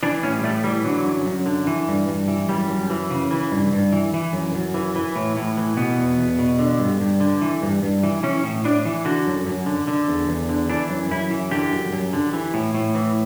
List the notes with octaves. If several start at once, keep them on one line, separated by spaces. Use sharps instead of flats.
E3 D4
A2 C#4
G3
A2 A3
E3 G3
D3 F#3
F#2
F#2
D3
E3
G2
G2
E3
F#2 G3
F#2
E3
C#3
E3
G2
G2
E3
E3
F#2
F#2
E3
E3
A2
A2
E3
B2 B3
E2
E2
B2
D3
G2
G2
D3
E3
G2
G2
E3
E3 C#4
A2
A2 D4
E3
D3 F#4
F#2
F#2
D3
D3
E2
E2
D3
E3 D4
F#2
F#2 E4
E3
D3 G4
F#2
F#2
D3
E3
A2
A2
E3